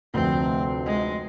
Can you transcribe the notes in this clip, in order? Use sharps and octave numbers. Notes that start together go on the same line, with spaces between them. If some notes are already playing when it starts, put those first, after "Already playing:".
F1 D2 C4
G#3